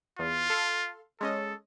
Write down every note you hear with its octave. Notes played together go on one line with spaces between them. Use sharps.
E2 F4
A4 F5 C6
G#3 C#4 A4 D#5